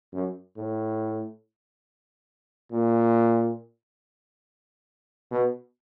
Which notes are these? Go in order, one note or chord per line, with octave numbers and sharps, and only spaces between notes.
F#2
A2
A#2
B2